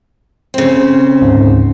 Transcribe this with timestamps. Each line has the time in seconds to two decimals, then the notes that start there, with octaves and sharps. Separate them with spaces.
0.54 C#3 C4
1.21 D2 G#2